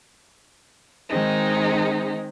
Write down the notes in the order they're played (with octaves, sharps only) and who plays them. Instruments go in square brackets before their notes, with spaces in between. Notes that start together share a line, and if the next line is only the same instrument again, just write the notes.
[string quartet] D#3 G#3 C4 D#4